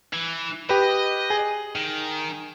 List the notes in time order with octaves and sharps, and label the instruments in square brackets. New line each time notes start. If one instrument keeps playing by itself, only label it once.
[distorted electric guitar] E3
[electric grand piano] G4 B4 [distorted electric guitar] D#5
[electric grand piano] G#4
[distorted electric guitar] D#3